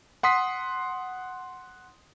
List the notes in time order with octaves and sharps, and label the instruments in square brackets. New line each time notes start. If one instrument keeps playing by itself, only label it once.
[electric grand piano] F#5 C6 D#6 B6 C7